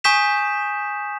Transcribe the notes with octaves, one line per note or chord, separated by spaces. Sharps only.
G#5 C#6 D#6 G6 B6 E7